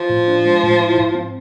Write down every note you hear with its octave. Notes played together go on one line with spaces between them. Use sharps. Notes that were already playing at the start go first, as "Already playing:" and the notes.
Already playing: F3
A2
D4
G#3
A2
E4
G#2
C4